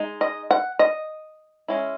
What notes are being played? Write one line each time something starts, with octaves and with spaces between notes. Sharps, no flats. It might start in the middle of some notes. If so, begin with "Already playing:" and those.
Already playing: G#3 D#4
D#5
F#5
D#5
G#3 C#4 E4